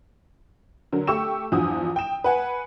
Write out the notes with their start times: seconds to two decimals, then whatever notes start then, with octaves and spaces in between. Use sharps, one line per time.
0.93 D3 F#3 A#4
1.07 A3 G4 C#6 E6 E7
1.52 E2 G2 F3 F#4 D#6
1.96 G5 E7
2.24 B4 F#5 G#5